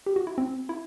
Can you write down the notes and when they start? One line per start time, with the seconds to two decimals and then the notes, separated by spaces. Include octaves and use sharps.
0.06 G4
0.16 F#4
0.27 E4
0.38 C4
0.69 E4